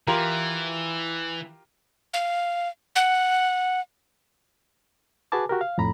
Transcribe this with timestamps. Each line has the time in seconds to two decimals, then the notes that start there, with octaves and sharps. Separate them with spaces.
0.07 E3 F4 G4 A#4
2.14 F5
2.96 F#5
5.32 F#4 G#4 B4 G#5 A5 D6
5.49 F#4 G4 A#4
5.61 F5
5.78 F2 A2 A#5 B5